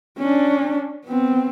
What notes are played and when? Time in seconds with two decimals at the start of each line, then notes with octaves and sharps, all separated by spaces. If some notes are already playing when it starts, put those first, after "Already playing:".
0.19 C#4 D4
1.06 B3 C4